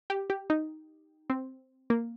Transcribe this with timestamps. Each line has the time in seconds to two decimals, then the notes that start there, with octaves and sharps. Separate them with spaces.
0.10 G4
0.30 G4
0.50 D#4
1.30 C4
1.90 A#3